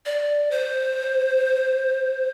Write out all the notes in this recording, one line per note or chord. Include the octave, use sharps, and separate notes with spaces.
D5
C5